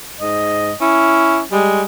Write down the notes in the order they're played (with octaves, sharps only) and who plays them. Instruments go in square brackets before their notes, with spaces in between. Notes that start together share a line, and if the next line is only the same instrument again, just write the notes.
[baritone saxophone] G#2 [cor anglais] D#5
[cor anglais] C#4 [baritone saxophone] E4
[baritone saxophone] G3 [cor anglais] G#3